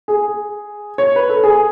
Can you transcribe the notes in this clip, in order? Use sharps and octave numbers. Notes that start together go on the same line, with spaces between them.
G#4
C#5
B4
A4
G#4